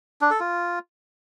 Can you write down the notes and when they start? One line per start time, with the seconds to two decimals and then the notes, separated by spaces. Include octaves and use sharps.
0.21 D4
0.31 A4
0.40 F4